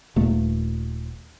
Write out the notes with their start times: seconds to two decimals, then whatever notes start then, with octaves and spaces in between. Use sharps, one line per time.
0.16 D#1 A3